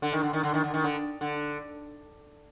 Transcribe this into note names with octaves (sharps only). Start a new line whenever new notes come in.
D3
D#3
D3
D#3
D3
D#3
D3
D#3
D3
D3